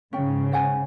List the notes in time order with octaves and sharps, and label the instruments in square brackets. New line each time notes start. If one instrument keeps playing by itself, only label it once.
[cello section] G#2 C#3 [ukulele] C#4 G5
[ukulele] C5 F#5 G#5